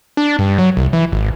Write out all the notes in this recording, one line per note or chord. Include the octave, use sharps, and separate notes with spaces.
D4
G2
F#3
C2
E3
G#1